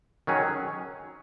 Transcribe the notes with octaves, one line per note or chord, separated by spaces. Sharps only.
D#3 F#3 C#4 G#4